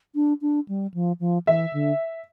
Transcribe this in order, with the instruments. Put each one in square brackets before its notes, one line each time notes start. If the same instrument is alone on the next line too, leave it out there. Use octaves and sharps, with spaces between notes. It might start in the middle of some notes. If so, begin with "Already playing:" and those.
[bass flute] D4
D4
G3
F3
F3
[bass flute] E3 [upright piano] E5
[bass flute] D3